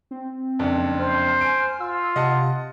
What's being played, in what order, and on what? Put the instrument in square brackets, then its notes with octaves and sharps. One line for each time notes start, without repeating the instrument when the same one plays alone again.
[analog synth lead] C4
[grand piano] F#1 F2 D4
[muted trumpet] C5 [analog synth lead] F6
[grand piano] G#5 D7
[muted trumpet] F4 [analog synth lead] E6
[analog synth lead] C3 [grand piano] D#5 F#5 A5